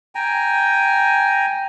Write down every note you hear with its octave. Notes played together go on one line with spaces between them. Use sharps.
G5 G#5 A#5